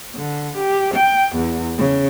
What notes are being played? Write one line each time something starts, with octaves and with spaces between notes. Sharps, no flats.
D3
G4
G5
E2
C#3